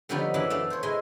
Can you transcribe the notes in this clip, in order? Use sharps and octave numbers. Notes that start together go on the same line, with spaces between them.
D3 F3 G3 B3 C#4 D#4
F#2 E3 D4 B5
A3 D4 A4 D5 F5
C5 C#5
G#3 E4 D#5 G#5 C6